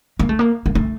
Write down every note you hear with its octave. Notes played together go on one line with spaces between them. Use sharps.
A#3
A3
A#3
A#3
A3